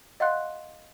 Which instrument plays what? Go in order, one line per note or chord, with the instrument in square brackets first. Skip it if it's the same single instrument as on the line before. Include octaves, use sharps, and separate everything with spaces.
[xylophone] D#5 F5 F#5 C6 F#6